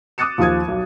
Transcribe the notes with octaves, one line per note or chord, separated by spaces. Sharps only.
D6 D#6 F#6 A6 C#7 E7
D#2 F3 F4 D#6 G#6
B1